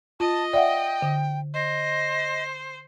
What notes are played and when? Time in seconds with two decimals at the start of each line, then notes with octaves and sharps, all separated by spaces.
0.20 F4 D#5 A5
0.53 D5 E5 F#5 G5
1.02 D3
1.54 C5 D#5